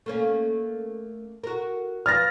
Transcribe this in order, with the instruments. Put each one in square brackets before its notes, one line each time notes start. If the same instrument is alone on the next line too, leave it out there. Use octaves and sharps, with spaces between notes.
[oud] A3 A#3 C#4
F#4 A#4
[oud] F3 B4 [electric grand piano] F6 A6 A#6